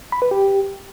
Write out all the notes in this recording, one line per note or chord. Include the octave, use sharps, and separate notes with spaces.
B5
B4
G4